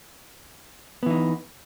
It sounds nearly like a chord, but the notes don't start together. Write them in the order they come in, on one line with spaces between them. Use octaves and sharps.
B3 E3 D#4